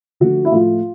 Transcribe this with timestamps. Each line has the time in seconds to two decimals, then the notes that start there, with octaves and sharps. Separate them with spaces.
0.20 D3 F3 A3 F#4
0.45 E4
0.52 A2 F3 A3 F4